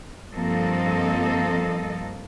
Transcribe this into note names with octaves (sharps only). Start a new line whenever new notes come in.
G2 F3 A#3 C4 A4 D#5